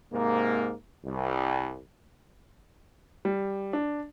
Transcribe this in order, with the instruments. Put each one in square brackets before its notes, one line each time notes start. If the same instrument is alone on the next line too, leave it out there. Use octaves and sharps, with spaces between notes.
[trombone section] G#2 C3 A#3
C2
[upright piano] G3
D4